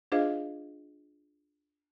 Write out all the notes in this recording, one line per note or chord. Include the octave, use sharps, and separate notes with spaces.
D4 F4 G#4 C5 D#5 F5